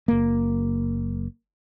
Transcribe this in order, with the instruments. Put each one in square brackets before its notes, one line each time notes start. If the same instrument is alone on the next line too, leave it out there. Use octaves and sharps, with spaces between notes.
[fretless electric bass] F#1 A#3